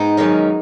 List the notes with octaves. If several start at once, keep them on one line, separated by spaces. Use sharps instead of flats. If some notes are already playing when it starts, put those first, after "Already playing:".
Already playing: G#2 B3 D#4
F#2 D#3 G#3 C#4